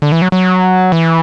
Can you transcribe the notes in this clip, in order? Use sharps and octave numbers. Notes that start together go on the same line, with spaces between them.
D3
E3
F#3
F#3
E3